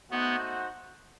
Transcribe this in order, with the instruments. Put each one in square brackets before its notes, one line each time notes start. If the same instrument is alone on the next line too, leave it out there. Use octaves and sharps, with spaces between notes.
[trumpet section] A3 D#4 F#4 C5 F#5 [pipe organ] B3